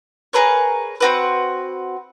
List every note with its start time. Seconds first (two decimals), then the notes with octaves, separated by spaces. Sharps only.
0.33 G#4 A#4 B4 C#5
1.01 C4 F#4 B4